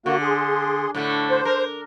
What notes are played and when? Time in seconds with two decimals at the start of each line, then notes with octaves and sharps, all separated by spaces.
0.06 D3 A#3 F#4
0.21 G#4 C6
0.95 A2 D3 A3
1.30 C5
1.45 A#4